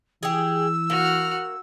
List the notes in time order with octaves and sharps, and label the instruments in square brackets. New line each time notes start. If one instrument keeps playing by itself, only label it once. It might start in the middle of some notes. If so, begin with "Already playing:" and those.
[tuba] E3 [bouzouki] G4 G#4 [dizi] E6
[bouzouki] A#3 [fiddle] F#4 F6